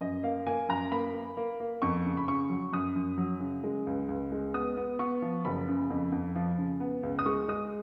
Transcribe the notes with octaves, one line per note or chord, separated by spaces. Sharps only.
F#2 D#5
A#3 F5
A#3 G#5
F#2 A#5
A#3 B5
A#3
A#3
A#3
F2 C#6
C#3
B5
C#3 C#6
F#3
F#2 D#6
F#2
F#3
C#3
G#3
C#2
C#2
G#3
B3 D#6
B3
B3 C#6
F3
F#1 B5
C#3
F2
F2
F3
C#3
B3
C#2
D#6
G#3 C#6
G#3 D#6